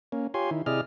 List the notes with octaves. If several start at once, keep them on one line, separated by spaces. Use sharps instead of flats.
A#3 C#4
F4 G4 C#5 G#5 C6
D#3 E4
C3 E4 G#4 D5 D#5 F6